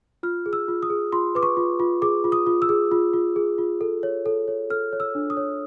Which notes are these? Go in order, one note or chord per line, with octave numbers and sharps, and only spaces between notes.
F4 F6
G#4
E6
F4
D#6
G#4
F4 C6
B4 D6
C#6
F4
F4
G#4 D6
F4
D#6
F4
E6
G#4
F4
F4
G#4
F4
A4
C#5
A4
C#5
A4 F6
C#5
E6
D4
D#6
C#5